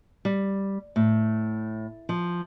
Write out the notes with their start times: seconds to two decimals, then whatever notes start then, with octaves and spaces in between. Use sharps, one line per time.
0.25 G3
0.96 A2
2.09 F3